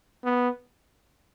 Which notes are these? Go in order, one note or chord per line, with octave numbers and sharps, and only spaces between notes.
B3